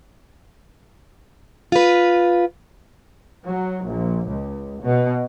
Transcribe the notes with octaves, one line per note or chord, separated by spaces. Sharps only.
F4 B4
F#3
A#1
C#2
B2